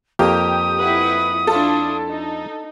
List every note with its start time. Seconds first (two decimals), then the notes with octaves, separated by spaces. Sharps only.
0.19 F2 A#3 G4 D#6
0.78 E4 B4 F#5
1.47 D4 E4 F4 A4
2.08 D#4